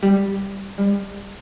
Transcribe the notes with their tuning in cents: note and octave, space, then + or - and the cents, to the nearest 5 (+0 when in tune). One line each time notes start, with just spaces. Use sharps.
G3 +5
G3 +40